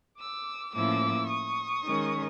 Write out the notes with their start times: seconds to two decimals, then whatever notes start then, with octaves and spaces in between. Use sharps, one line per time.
0.19 D6 E6
0.74 A2 F3 A#3 C#4 E4 D6 E6
1.28 C#6 D#6
1.83 D#3 G#3 C#4